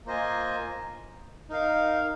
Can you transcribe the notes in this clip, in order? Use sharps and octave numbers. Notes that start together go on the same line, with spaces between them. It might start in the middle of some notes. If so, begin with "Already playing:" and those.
A#3 F4 C5 D#5 G#5
D#4 A#4 F5